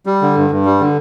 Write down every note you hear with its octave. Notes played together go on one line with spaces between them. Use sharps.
G3
D3
G2
G2
G3
D3